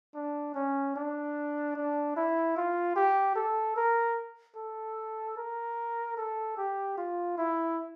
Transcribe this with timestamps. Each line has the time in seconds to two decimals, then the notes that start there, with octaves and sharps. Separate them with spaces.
0.15 D4
0.55 C#4
0.96 D4
1.76 D4
2.16 E4
2.56 F4
2.96 G4
3.35 A4
3.76 A#4
4.56 A4
5.37 A#4
6.17 A4
6.57 G4
6.97 F4
7.38 E4